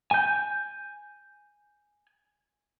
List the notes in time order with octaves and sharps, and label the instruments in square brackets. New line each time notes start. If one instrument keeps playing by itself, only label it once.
[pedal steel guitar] G#5 G6